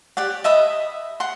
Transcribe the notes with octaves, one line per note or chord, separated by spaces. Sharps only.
G4 D5 F#5
D#5 E5 B5 D#6
F#5 C6